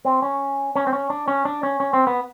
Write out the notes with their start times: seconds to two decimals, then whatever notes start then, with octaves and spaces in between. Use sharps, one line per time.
0.05 C4
0.22 C#4
0.76 C#4
0.87 C4
0.93 C#4
1.10 D4
1.28 C#4
1.45 D4
1.63 C#4
1.80 C#4
1.93 C4
2.07 B3